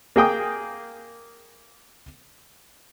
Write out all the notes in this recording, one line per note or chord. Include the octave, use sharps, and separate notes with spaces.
A#3 G#4 G5 D#6